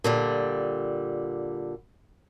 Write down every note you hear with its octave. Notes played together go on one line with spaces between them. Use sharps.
A#2 D3 G3